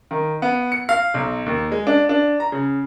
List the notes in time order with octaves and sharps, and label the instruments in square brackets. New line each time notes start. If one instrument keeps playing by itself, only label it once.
[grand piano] D#3
B3
C#7
F5
B1
D#2
G#3
D4
D4
A#5
C#3